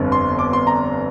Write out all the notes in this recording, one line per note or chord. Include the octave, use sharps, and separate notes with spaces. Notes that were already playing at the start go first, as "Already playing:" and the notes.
Already playing: G1 F2 D3 G3 C4
C6
D6
C6
A#5